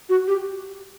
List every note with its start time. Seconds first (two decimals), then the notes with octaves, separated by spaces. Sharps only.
0.09 F#4
0.27 G4